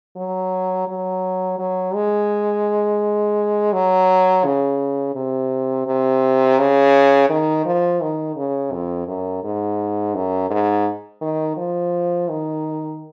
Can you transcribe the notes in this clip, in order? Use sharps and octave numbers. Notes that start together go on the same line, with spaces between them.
F#3
F#3
F#3
G#3
F#3
C#3
C3
C3
C#3
D#3
F3
D#3
C#3
F2
F#2
G#2
F#2
G#2
D#3
F3
D#3